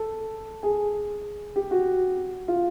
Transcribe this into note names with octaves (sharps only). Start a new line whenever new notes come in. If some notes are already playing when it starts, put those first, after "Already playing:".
Already playing: A4
G#4
G4
F#4
F4